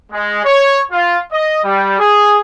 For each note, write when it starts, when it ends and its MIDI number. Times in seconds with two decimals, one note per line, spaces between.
0.12 0.42 56
0.45 0.80 73
0.91 1.18 65
1.33 1.60 75
1.64 1.98 55
1.99 2.39 68